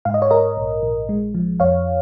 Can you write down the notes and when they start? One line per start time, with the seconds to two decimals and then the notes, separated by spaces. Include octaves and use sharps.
0.05 G#2 F5
0.14 D#5
0.22 C#5
0.30 G#2 A#4 D#5
0.57 A#1
0.83 A#1
1.09 G#3
1.35 F3
1.60 F2 C#5 F5